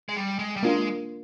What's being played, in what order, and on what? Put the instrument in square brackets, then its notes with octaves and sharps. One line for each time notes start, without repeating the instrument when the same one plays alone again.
[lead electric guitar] G#3
G3
G#3
G3
[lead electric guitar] G#3 [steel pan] A#3 D4 F4